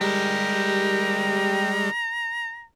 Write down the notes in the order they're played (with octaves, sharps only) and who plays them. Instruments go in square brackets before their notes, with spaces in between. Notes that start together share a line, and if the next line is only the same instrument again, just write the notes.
[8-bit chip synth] G3 G#3 [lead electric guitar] G4 A#4 [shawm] A#5